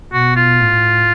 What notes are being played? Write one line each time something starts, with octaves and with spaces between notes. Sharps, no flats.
B2 F#4
F4
A2